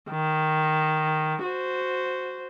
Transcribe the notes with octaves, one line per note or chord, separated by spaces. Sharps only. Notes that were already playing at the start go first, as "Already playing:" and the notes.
D#3
F#4 C5